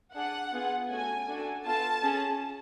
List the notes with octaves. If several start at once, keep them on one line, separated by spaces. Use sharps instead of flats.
D4 G#4 F#5
B3 F4 G#4
A3 C#4 F#4 A4 G#5
D4 F#4 A4
B3 F4 A4 A5
C#4 G#4